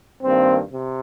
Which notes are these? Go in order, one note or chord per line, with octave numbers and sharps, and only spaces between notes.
G2 D#3 A#3 C4
C3